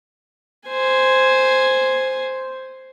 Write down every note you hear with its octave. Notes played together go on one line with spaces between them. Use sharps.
C5 G#5